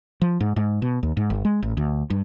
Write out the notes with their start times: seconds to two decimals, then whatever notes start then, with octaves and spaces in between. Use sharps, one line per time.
0.22 F3
0.41 G#2
0.56 G#2
0.82 B2
1.03 D#2
1.17 G#2
1.30 G1
1.45 G#3
1.63 A1
1.77 D2
2.10 G2